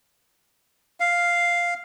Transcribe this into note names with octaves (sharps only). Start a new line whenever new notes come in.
F5